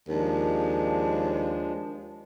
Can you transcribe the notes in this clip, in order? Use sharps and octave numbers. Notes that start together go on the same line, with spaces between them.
D#2 F3 G#3 D4